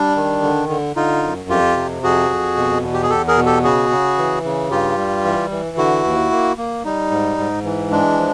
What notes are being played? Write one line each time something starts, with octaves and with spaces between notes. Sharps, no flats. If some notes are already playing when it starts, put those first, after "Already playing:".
Already playing: G3 D4
D#3
D3
D3
D3 D#4 F4
F#2
F2 F4 G4
C3
F2 F#4 G#4
F2
B2
E2
G4
G#4
E2 G4 A4
G#4 A#4
B2
G4 A4
C#3 F#4 G#4
C#3
E3
C#3
G2 F4 G4
G3
E3
E3
D3 E4 F#4
D#2
A#3
A#3
G3 D#4
G#2
G#2
E3
G#3 D4
F3